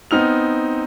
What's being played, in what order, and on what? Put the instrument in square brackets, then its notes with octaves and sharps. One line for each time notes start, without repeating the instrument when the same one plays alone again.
[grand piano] B3 C4 D#4 F6 F7